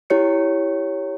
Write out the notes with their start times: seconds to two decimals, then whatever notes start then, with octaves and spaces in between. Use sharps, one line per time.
0.10 E4 G4 C#5 C#7